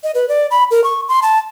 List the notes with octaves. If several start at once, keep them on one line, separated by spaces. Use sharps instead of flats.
D#5
B4
D5
B5
A#4
C#6
C6
A5